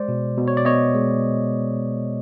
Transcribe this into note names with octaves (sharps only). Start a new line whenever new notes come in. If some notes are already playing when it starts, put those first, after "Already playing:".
Already playing: G#3 C5 D5
B2
B2
C#5
D5
B3 C#5 D#5
G#3